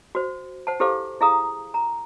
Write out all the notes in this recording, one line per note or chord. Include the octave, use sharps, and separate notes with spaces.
F#4 C5
C5 F#5 A5
E4 G4 A4 C5 F5 D6
E4 G#4 F5 A#5 D#6
A#5